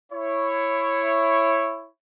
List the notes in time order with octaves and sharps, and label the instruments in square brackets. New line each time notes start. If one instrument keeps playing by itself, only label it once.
[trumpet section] E4 C#5